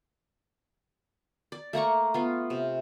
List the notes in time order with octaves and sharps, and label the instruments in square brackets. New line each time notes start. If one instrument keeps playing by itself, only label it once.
[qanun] D5
A3 A#3 A#5 C#6
B3 F4
C3